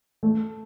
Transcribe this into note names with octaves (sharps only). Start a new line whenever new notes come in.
A3